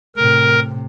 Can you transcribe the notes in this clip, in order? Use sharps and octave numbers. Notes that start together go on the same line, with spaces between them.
A2 C3 A#4